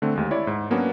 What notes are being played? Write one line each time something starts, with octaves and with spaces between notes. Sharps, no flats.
D3 A3 C4
D#2 G#3
E4 C#5 D5
G#2
F#3 A#3 B3 C#4 D4 F#4